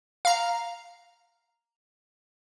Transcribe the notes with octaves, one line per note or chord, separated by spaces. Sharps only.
F5 A#5